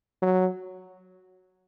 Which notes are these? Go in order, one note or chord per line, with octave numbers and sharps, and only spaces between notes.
F#3